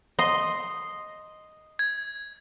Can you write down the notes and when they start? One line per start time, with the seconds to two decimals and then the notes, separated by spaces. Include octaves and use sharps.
0.19 D#5 C6
1.79 G#6